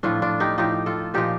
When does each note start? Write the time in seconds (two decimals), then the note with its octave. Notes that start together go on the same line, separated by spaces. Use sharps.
0.03 A2 F3 D4 F4
0.22 D4 F4
0.40 D#4 G4
0.58 A2 F3 D#4 G4
0.86 F4 A4
1.14 A#2 F3 D#4 G4